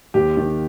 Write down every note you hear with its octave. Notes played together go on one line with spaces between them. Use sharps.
D#2 G4
D#3